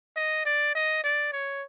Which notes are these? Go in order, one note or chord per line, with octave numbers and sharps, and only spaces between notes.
D#5
D5
D#5
D5
C#5